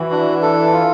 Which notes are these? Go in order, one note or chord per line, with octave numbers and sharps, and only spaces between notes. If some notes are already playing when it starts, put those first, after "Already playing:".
Already playing: E3 F#4
D4
A4
F4